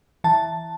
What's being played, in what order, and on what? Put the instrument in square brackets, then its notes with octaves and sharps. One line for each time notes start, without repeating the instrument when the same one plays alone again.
[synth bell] E3 A5